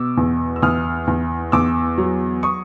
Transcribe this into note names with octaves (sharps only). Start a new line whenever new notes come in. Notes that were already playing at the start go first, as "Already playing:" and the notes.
Already playing: B2 D6 E6
E2
E6
E2 D#6 F6
E2
E2 D6 E6
F#3
C#6 D#6